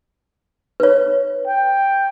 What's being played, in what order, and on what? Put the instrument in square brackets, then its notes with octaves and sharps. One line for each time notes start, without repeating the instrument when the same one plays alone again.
[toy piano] B4 C#5
[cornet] G5